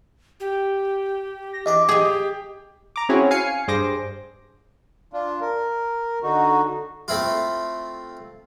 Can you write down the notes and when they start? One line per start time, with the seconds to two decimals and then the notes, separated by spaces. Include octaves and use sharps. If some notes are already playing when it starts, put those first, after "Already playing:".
0.40 G4
1.53 A#6
1.66 E2 D4 D5 D#5
1.89 G4 G#4 G#5
2.96 A#5 D6
3.09 C4 C#4 E4 F#4 G#4 C#5
3.31 F5 G#5 C7 C#7
3.68 G2 G#4 C5 D6 A#6
5.13 D4 F4
5.41 A#4
6.23 D3 D#4 F#4
7.08 A3 C4 E4 F4